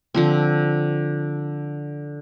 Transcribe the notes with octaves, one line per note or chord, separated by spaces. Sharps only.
D3 F3 C4